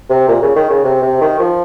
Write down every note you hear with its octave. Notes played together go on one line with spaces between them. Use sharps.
C3
A#2
C#3
D#3
C#3
C3
C3
D#3
F3